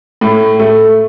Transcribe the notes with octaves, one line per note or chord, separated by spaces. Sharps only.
A2
A3